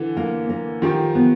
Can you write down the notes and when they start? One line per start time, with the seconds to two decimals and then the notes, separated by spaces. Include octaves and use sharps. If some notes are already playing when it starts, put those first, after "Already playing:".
Already playing: D3 E3
0.17 A#3
0.49 A#3
0.82 D#3 F3 G4
1.15 B3